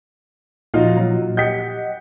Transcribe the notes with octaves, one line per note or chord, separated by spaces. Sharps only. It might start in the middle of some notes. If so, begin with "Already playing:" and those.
A#2 F3 D#4 F4 F#4
F#3
G4 D#5 F#5 G6 B6 C#7